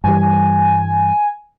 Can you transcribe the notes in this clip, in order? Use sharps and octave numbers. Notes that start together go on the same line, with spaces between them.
G2 E3 G3 G#5